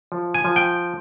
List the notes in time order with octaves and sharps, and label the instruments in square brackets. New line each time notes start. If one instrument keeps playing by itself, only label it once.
[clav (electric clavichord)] F3
G#5
F3
G5